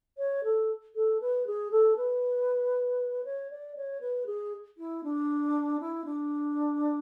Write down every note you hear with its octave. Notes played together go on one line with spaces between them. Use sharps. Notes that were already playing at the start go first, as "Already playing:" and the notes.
C#5
A4
A4
B4
G#4
A4
B4
C#5
D5
C#5
B4
G#4
E4
D4
E4
D4